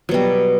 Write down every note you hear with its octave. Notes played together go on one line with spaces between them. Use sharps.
B2 F#3 G3